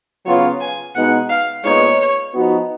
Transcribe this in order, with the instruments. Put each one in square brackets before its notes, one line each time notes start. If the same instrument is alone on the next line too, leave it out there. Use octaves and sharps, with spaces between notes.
[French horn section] C#3 F#3 B3 F4 [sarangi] C#5
[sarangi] G#5
[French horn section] B2 G#3 B3 D#4 [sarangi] F#5
[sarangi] F5
[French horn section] A#2 G#3 B3 D#4 [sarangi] C#5
[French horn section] F3 B3 D#4 F#4